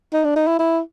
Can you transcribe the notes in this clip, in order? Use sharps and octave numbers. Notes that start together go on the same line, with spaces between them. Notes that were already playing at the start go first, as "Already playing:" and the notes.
D#4
D4
D#4
E4
E4